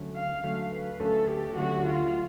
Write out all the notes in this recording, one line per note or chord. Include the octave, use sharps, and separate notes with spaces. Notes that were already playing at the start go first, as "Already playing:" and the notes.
Already playing: D2 D3 F#3 A3 C#4
F5
D2 D3 F#3 A3 C#4
B4
D2 D3 F#3 A3 C#4 A4
G4
D2 D3 F#3 A3 C#4 F#4
F4